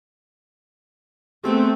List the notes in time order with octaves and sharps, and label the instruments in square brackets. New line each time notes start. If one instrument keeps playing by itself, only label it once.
[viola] A3 C4 [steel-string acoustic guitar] B3 G4 G#4